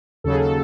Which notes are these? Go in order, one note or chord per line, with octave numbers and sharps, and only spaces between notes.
D#2 C#3 F#3 A4
G#4
A4